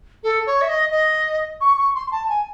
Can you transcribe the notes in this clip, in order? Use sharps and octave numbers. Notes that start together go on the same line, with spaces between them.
A4
C#5
E5
D#5
D#5
C#6
C#6
C6
A5
G#5